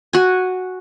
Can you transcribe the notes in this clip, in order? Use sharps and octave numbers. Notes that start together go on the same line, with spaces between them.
F#4 G#5